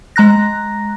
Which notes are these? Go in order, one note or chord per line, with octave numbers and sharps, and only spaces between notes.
G#3 A#5 F#6 A#6